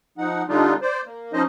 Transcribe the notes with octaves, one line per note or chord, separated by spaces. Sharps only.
F3 D#4 F#5
D3 G3 D4 D#4 F4
C5 D5
A#3
F3 C#4 D#4 C5 D#5